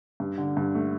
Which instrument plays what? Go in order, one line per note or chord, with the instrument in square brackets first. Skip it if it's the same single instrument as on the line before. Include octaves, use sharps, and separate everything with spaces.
[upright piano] G2
D3
G2
A3